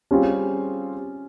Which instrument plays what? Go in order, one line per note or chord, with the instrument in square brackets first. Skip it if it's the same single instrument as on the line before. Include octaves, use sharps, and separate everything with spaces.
[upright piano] G3 C4 F4 G#4 [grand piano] C#4